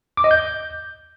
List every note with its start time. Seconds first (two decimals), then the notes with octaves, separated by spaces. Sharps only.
0.17 D6
0.24 D#5
0.31 G6